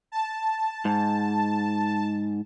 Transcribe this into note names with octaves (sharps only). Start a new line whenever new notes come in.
A5
G#2